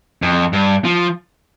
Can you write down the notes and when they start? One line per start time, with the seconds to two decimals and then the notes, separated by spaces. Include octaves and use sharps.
0.22 F2
0.53 G2
0.85 F3